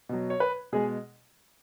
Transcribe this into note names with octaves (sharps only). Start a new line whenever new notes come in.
B2 F#3
C#5
B4
B2 G#3 G#4